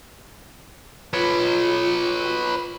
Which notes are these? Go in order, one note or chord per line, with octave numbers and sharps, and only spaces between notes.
F4 B4 C#5